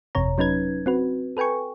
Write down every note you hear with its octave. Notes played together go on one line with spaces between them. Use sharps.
G1 F2 C3 C#5 A#5
F#3 C#4 D#4 B4 G#6
C4 F#4 B4
A4 B4 G5 G#5 C#6